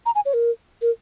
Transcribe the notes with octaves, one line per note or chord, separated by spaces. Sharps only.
A#5
G#5
C#5
A#4
A#4